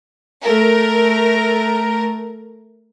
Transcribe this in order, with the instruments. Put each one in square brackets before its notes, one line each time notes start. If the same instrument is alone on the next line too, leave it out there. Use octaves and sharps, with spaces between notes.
[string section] A3 A#4